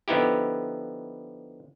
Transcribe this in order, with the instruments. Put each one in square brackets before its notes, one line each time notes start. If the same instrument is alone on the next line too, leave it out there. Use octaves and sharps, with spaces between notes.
[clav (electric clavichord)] D3 F3 B3 D#4 E4 G4